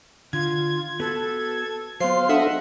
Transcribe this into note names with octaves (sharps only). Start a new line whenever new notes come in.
D3 F4 G#6
B3 F#4 A4 B4
F#3 B3 C5 F5 C6 C7
D4 A4 D#5 E5 F#5